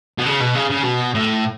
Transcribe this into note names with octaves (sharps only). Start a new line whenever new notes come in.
B2
C#3
B2
C#3
C#3
B2
A2